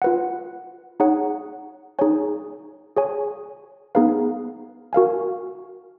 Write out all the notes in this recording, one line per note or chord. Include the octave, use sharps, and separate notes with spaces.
F4 B4 F#5
D#4 G#4 C#5 F#5
D#4 G#4 C#5 G#5
G#4 C#5 G#5
B3 D#4 G#4 B4 F5
F#4 A#4 F5 G#5